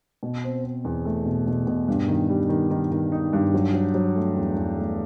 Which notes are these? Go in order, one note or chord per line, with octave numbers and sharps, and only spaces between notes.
B2
C4
C4
E2
A3
B2
B2
B2
G2
D#3
G3
D#3
D#3
D#3
D#4
G2
F#3
F#3
F#3
A3
E2
E2
A3